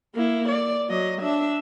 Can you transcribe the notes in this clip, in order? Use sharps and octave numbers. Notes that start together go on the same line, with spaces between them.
A#3 E4
D5
F#3 D#5
D4 E5